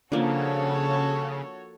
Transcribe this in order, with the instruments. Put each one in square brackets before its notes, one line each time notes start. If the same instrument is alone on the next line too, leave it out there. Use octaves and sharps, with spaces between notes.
[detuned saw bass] C#3 [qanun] F3 A#3 D4 [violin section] F#4 A4 C#5